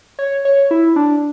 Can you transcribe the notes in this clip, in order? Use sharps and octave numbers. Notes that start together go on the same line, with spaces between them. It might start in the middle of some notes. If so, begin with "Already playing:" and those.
C#5
C#5
E4
D4